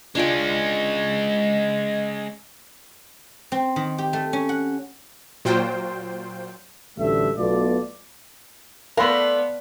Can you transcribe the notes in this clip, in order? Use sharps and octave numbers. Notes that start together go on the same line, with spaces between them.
G#3 C#4 D4 F4 G5
C4
D#3
G4
A3
C#4
F#5
A#2 F#3 F4 C5 G5
A1 D2 G3 A3 E5
B1 B2 A3 F4 D5
A3 B3 D4 A#4 F5 B5 C6